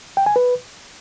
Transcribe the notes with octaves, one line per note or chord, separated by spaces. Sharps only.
G5
G#5
B4